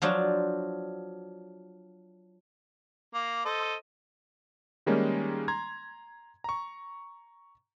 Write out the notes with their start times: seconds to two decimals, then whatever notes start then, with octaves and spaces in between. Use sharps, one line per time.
0.02 F3 F#3 D4 F4 F#4
3.14 A#3
3.45 A4 C5 D#5
4.86 D#3 G3 G#3 A#3 C#4 D#4
5.48 A#5 C6 G#6
6.44 A#5 C#6